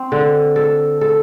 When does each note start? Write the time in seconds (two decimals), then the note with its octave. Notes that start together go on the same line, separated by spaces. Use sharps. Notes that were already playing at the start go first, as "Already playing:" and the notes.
Already playing: C4
0.12 D3
0.56 A4
1.01 A4